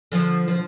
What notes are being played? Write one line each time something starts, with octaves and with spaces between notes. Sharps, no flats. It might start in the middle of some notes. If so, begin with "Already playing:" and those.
D3 F3
F3